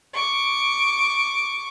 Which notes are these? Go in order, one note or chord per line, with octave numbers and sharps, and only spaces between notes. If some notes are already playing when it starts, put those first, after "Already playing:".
C#6 D6